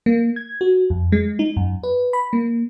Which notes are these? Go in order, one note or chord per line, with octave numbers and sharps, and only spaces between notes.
A#3
G#6
F#4
F2
G#3
D#4
F#2
B4
B5
A#3